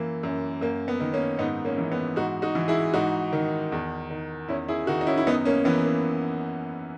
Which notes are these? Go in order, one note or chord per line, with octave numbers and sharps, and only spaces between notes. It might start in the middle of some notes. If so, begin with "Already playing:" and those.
Already playing: F#2 E3 A#3
F#2
F#2 A#3
B3
D#3
A#3 C#4
G#2 B3 D#4
A#3 C#4
E3
B3
G#2 D#4 F#4
D#4 F#4
E3
E4 G#4
G#2 D#4 F#4
D#3
E2
D#3
E2 C#4 E4
E4 G#4
D#3 D#4 F#4
D#4
C#4 E4
E4
F#2 B3 D#4
A#3 C#4
E3 B3
A#3